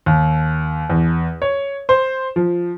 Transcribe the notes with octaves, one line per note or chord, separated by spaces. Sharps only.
D#2
E2
C#5
C5
F3